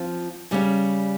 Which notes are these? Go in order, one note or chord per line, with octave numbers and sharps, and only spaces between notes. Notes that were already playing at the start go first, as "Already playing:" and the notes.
Already playing: F3 C4 F4
C#3 G3 C#4